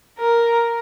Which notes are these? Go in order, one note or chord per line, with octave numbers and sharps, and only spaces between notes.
A#4